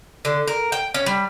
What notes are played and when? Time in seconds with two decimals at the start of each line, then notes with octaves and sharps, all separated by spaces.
0.25 D3
0.48 A#4
0.72 G5
0.94 C#4
1.06 G3